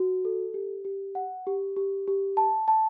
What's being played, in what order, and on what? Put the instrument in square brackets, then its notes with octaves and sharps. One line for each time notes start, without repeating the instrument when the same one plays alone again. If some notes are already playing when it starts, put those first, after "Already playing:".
Already playing: [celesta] F#4
A4
G4
G4
F#5
G4
G4
G4
A5
A5